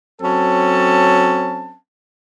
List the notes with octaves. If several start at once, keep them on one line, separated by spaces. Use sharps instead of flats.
F#3 C4 C#4 A4 A5